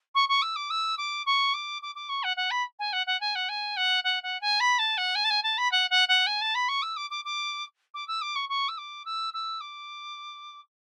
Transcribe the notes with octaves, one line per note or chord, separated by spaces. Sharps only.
C#6
C#6
E6
D6
E6
D6
C#6
D6
D6
D6
C#6
F#5
F#5
B5
G#5
F#5
F#5
G#5
F#5
G#5
F#5
F#5
F#5
G#5
B5
A5
F#5
G#5
A5
G#5
A5
B5
F#5
F#5
F#5
G#5
A5
B5
C#6
E6
D6
D6
D6
D6
E6
D6
C#6
C#6
E6
D6
E6
E6
D6